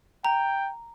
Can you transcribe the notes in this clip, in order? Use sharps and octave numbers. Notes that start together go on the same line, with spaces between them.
G5 A#5